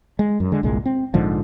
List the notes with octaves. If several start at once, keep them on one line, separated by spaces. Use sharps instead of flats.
G#3
F#2
D3 G#3
G1 C2 A#2 G#3
C4
A#1 G#2 D3 F3